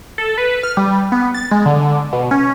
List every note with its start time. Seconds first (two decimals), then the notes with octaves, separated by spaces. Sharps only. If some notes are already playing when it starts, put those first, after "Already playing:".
0.18 A4
0.38 B4
0.63 F6
0.77 G3
1.12 B3
1.34 A6
1.51 G#3
1.66 D3
2.13 B2
2.31 C#4